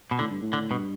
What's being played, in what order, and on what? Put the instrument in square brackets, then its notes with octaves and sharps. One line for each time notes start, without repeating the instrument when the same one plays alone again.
[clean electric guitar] B2
[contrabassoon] A2 [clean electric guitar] D3
[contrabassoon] G2
A2
[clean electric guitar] D3
[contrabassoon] G2 [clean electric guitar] B2